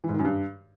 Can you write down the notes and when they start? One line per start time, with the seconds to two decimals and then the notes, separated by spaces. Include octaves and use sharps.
0.04 E3
0.09 G#2
0.14 D#3
0.19 F#2
0.25 G2